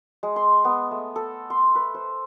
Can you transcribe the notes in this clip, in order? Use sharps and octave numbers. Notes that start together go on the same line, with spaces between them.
G#3
C6
B3
A3
A4
C6
B4
C5